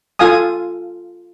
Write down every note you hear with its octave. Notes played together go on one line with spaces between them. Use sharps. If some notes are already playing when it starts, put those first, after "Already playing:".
F4 A4 F5 G#5 D#6